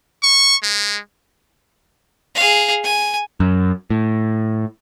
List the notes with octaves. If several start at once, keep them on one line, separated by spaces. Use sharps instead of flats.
C#6
G#3
G#4 F5
G#5
F#2
A2